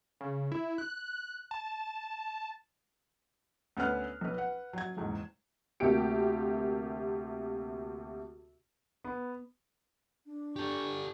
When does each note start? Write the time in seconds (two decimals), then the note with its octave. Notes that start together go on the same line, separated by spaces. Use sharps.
0.21 C#3
0.52 E4
0.78 F#6
1.51 A5
3.77 D2 B3 C#4 B4 F6 F#6
4.21 B1 B4
4.36 B4 F#5
4.73 F#3 G#6
4.97 F#1 E2 G#2
5.80 D2 C3 A#3 G4 D7
9.04 B3
10.26 D4
10.56 G4 A4 D5 C#6